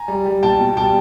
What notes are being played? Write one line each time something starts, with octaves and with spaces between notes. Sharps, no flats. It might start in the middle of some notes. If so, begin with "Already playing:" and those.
Already playing: G#5 A#5
G3
G3
B2 G5 A5
B2
G3 G5 A5